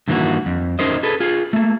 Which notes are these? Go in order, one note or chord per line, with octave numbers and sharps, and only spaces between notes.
G2 D#3 E3 A3 A#3 F#4
F2
C#4 D#4 A#4 C5 D#5
G#4 A4 B4
F4 G#4
A3 A#3